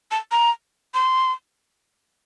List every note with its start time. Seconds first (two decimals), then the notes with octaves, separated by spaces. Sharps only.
0.11 A5
0.32 A#5
0.94 C6